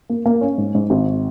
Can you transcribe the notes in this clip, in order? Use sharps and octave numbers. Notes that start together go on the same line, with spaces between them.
A#3
A#3
C#4
G#2
G#2
G#1